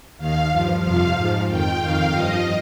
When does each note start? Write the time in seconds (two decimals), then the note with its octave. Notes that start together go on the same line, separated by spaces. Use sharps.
0.18 D#2 D#3 F5
0.51 G2 F3
0.83 F2 C3 F3 F5
1.16 G#2 F3
1.48 F2 D#3 G5
1.80 F2 D#3 F5
2.12 G2 F3 D#5